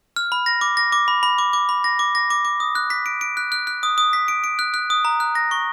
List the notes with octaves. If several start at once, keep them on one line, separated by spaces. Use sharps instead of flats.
F6
B5
A#6
D6
A#6
D6
B5
B5
D6
D6
B5
A#6
D6
A#6
D6
D6
D#6
F#6
B6
D7
D7
F#6
F#6
F#6
D#6
D#6
B6
D7
D7
F#6
F#6
D#6
A#5
F#6
A#6
C#6